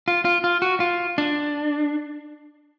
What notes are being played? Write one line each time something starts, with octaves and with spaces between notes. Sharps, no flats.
F4
F4
F4
F#4
F4
D4